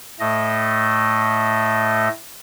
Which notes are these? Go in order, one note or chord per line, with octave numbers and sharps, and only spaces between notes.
A2 A3 D#5